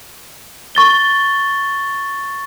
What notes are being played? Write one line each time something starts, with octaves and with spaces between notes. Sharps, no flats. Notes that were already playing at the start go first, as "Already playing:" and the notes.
C#6 A6 G7